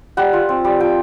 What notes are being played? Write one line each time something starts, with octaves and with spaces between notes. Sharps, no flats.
G3 F#5
F4
C4
G3
F3 G5